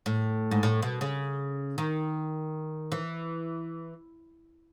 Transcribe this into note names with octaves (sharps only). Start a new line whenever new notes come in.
A2
G#2
A2
B2
C#3
D#3
E3